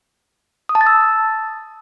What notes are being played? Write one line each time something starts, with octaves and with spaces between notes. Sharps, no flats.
D#6
A5
A6
E6